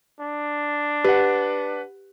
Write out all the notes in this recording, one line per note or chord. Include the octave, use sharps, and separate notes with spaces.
D4
G4 B4 F#5